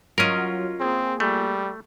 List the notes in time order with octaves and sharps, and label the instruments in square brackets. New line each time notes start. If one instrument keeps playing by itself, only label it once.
[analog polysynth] F#3 F#4 [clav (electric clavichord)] C#4 A#4 [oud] F4 D#5
[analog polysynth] A#3 G#4 [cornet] C4
[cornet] G3 [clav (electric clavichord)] A3